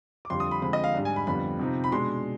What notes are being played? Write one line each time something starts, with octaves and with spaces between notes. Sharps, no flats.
D6
F2 D3 G3 C6
D#6
B5
D3 F3 G#3 C4 B5
D#5
F5
G#2 G3 D4
G#5
B5
F2 D3 G3 B3 B5
C3 F3 C4 D#4
B5
B2 G#3 D4 C6